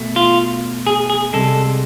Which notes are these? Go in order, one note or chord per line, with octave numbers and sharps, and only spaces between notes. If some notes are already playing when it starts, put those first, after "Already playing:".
Already playing: B2 A3
F4
G#4
G#4
C2 C3 G#3 A4